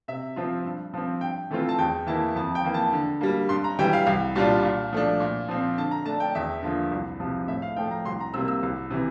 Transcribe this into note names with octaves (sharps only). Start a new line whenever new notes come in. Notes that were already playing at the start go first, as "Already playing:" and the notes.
C3 E5
F3 C4 F4
G2
F3 C4
G2 G5
E3 A3 C4 F4
A5
E2 G5
E3 A#3 E4 A5
F2 A5
G5
E3 A#3
A5
D3
G3 A#3
G2 C6
A#5
E3 G3 G5
F5
C2 F5
A#2 G3 D4 F4 A5
A#2
F3 A3 D4
A#2
F3 C4
D3 A5
A#5
A3 D4 A5
G5
E2 E5
D3 F3 A#3 F4
C2
C3 F3
A2 E5
F5
F3 A3 G5
A#5
C2 C6
A#5
C3 G3 A#3 E6
E6
C2
C3 E3